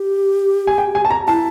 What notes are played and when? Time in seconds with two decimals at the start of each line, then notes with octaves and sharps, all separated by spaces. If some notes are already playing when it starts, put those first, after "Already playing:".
Already playing: G4
0.67 G#5
0.78 G5
0.95 G#5
1.05 A5
1.10 A#5
1.27 E4 A5